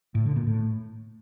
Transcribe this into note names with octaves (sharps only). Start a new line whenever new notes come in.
A2
D3
A#2
A2